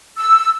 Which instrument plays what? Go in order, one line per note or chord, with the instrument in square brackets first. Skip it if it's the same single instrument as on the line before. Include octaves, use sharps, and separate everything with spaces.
[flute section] E6